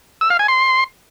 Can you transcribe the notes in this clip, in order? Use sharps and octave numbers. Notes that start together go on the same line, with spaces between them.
E6
F5
G#5
C6